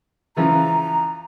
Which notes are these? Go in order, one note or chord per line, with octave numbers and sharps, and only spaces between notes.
C#3 E3 F3 A#5